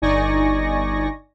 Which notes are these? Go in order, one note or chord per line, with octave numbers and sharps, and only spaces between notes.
G1 D#4 D5 G#5 C#6 A#6